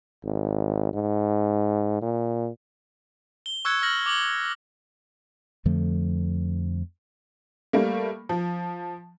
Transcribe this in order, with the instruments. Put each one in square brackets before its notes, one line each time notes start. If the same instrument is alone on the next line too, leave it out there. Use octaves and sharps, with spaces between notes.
[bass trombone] G#1
G#2
A#2
[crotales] G7
C#6 E6 F#6 G#6 C#7
E6 F6 A#6 F#7
D6 F#7 G7
[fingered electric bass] F2 D3 F3 A3
[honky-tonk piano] G3 A3 A#3
F3